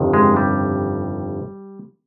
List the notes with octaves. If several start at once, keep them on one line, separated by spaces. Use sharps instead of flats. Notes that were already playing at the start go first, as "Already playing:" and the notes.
Already playing: G1 F2 C3 D#3
G#3
G3